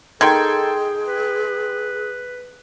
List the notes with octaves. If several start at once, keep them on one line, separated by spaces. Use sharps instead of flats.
D#3 G#4 A4 G5 C6 G#6
B4